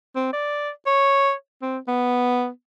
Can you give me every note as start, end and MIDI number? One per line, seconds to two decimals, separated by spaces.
0.15 0.32 60
0.33 0.70 74
0.87 1.32 73
1.62 1.78 60
1.88 2.48 59